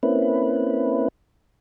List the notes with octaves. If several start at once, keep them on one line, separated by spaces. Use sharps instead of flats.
A#3 C4 C#4 E4 B4